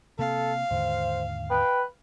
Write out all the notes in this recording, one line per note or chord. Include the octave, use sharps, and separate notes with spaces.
C3 A#3 C4 A4 F5
D#2 G#2 D3 C5
B4 G5